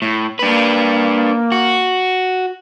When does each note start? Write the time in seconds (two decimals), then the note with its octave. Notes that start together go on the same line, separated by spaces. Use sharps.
0.02 A2
0.39 A#3 D4 B4
1.52 F#4